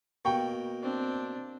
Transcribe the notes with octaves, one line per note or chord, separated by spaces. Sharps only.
B2 A#3 G5 C#6
C4 D4